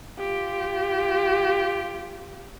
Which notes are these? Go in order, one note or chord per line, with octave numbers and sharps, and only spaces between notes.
F4 G4